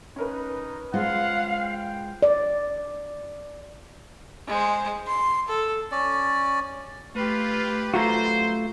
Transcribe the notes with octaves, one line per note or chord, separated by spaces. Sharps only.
C#4 D#4 A#4 B4
G#3 F4 C5 F5 F#5
G5
D5
G#3 C5
C6
A4
C#4 D5
A3 F4 G4 B4
F#2 A3 F4 F#4 C5 A#5